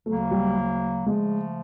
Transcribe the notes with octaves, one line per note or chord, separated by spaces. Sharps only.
D2 C#3 F#3 A3 A#3
G3
C#3 F3 G#3 A3